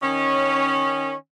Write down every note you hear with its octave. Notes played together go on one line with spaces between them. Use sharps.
D#3 C#4